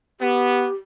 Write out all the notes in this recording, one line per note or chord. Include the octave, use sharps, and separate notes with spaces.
B3 G4